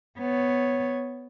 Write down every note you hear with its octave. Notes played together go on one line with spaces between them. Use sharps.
B3 C#5